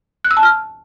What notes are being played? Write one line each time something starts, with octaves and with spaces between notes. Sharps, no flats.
F#6
E6
A5
F6